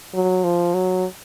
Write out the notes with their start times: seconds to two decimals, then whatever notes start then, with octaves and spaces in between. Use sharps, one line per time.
0.14 F#3
0.44 F3
0.74 F#3